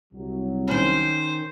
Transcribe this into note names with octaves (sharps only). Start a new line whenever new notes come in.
C2 F#3
D#3 C#4 C5